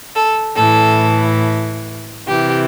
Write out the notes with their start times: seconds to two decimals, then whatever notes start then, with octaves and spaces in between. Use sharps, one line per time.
0.16 A4
0.58 A2 E3 A4
2.28 C3 E3 G4